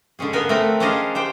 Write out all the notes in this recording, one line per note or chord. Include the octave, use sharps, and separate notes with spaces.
D3 G#3 C#4 G#4
B3 A#4 F5 G#5
A3 C4 A#4 B4
C#4 D4 G#4 C5 D#5 F5
G4 C5 G5